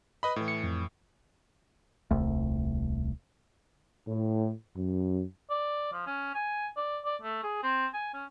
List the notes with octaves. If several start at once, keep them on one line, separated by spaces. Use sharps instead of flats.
B4 D#5 B5
A2 E3
C#7
F2
D#1 C2 A3
A2
F#2
D5
F3
C#4
G#5
D5
D5
A3
G#4
C4
G#5
C#4